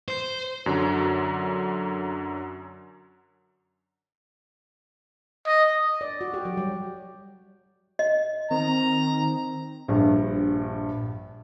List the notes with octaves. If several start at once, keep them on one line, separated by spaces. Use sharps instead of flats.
C5
F#2 D3 F#3
D#5
D5
F#4
G4
F#3
G3
D#5
D#3 C4 A#5
A#1 G2